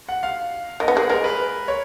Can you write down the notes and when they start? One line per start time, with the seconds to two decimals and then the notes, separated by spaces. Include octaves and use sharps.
0.09 F#5
0.23 F5
0.80 A#3 D#5
0.88 B3
0.95 A#3 G#4
1.10 G#3 A#4
1.24 B4
1.68 C#5